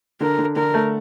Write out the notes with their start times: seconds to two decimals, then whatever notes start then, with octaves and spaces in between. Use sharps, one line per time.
0.21 D3 A#4
0.38 D3
0.56 D3 A#4
0.74 A3